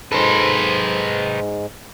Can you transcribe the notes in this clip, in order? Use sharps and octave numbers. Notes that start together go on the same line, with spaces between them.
G#2 D#4 A4 B4 C5